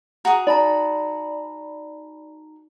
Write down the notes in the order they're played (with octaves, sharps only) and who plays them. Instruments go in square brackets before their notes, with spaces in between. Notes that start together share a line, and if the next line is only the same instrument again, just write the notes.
[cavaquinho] F#4 G#4 [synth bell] A#5
[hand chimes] D#4 A#5 [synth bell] D5 B5